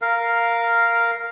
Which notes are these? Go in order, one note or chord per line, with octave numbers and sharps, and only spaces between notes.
A#4 F5